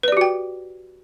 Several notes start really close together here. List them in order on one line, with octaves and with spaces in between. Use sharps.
B4 D5 G4 F#4 G5